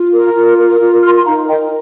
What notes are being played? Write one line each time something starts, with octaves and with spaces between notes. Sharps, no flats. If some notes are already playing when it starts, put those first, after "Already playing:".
Already playing: F4
A#4
F4
A#4
F4
A#4 C6 F6
C6
D#4 F5 A#5
A#4 D#5 G5